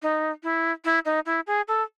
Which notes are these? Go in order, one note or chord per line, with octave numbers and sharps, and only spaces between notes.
D#4
E4
E4
D#4
E4
G#4
A4